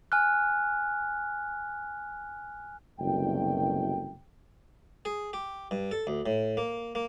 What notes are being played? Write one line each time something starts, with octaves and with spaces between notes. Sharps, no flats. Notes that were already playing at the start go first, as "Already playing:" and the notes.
G#5 F6 F#6
F#1 C2 B2 A3 G5
G#4
G4
G2
A4
D2
A2
A#3
A#3